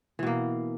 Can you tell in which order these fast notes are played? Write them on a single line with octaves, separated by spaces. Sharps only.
E3 B2 A#3